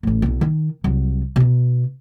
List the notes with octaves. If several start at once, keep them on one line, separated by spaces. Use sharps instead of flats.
A1 A2
B1 E4
D#3
C2 F#3
B2 D#4